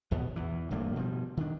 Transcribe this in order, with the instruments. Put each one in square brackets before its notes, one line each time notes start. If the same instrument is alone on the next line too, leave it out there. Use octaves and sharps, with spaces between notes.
[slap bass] A#1 D#2 B2 B3
E2 E3
D1 G2 A3 A#3
B2 F3 G3
D#3 D4